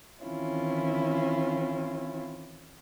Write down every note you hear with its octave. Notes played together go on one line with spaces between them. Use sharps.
D#3 E3 C4 C#4 E4 F4